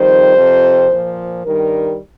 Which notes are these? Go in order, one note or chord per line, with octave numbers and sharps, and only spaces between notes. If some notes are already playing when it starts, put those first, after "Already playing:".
Already playing: F2 D#3 G3 C5
F2 C3 F3
A#2 F3
G2 D#3 G3 A#4